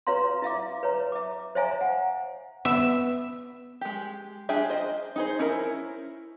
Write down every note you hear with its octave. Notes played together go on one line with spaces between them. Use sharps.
F4 B4 C#5 F5 A#5 C6
E4 E5 F5 D6
B4 C#5 A#5
E5 D6
C5 C#5 E5 F5 G#5 A#5
F#5
B3 E5
G#3 G4
D4 F4 G4 G#4 E5
C5 D#5
D#4 G#4 C5
C#4 E4 A#4